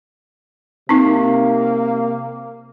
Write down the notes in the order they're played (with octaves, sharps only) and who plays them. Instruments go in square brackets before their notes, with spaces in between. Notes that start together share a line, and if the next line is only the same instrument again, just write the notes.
[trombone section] C3 A#3 [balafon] C4 D#4